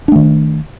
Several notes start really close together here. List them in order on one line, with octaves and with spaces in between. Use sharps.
D4 A3 D#3